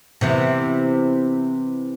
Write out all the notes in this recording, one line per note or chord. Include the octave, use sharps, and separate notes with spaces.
C3 E3 B3